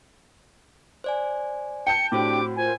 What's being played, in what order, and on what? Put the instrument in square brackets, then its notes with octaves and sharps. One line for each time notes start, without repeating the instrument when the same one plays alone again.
[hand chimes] C5 D5 G#5
[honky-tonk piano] G5 A5 G6 [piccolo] C#7
[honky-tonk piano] A2 [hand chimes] C4 F#4 C5 [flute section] D4 G4 G5 [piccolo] D6
[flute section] F4 A#4 C5 [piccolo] G#5